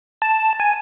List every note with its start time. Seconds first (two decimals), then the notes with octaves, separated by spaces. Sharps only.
0.22 A5
0.60 G#5